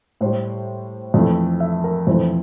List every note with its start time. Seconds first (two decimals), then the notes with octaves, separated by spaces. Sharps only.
0.21 A2 G3 C5
1.14 F2 E3 A3
1.60 E5
1.84 A#4
2.07 F2 E3 A3 C5